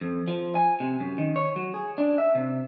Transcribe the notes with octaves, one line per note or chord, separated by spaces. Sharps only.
F2
F3
G#5
C3
F#2
D#3
C#5
F#3
G#4
D4
E5
C3